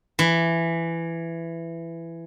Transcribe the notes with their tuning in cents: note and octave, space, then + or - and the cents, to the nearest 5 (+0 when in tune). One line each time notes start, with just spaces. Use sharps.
E3 +15